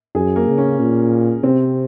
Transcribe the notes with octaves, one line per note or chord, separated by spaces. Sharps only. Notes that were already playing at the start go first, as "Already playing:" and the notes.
F#2 G#4
A#3
C#3
C#4
A#2
C3 C4